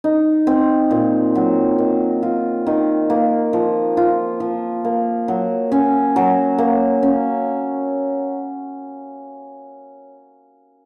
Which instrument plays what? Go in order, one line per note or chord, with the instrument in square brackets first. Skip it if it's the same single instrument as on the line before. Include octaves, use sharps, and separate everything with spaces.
[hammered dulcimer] D#4
C4
A#2
F#3
D#3
F4
D#3
A#3
F3
F4
F3
A#3
F#3
C#4
F#3
A#3
C#4